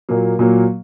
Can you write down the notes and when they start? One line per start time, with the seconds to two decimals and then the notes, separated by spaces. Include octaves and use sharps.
0.09 A#2 F#3 A#3
0.39 A#2 F#3 A#3